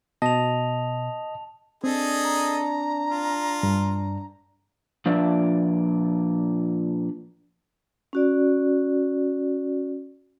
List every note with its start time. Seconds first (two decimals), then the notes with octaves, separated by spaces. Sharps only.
0.22 B2 D#5 A5 F7
1.84 C4 D4 G#4 A4 D#5
2.24 A#5
3.10 F4
3.63 G2
5.06 A#2 F3 D4 B4 D5 E5
8.13 C#4 F#4 D5